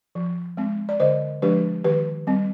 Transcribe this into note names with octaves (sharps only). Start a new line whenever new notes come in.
F3
G#3 C4
D5
D3 C5 D#5
F3 G#3 D4 G4 B4
D#3 G4 B4
G3 C4